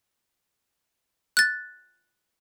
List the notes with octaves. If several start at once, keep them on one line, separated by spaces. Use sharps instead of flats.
F#6 A6